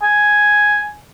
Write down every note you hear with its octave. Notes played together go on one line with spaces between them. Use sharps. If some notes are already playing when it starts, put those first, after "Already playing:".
G#5